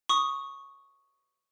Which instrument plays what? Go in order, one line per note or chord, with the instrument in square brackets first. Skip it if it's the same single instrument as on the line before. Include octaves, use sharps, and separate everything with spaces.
[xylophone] C#6 D#6